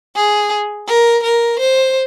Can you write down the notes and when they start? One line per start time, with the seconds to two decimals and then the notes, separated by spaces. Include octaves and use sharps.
0.15 G#4
0.87 A#4
1.23 A#4
1.59 C5